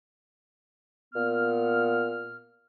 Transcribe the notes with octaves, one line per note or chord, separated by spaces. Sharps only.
A#2 B3 F6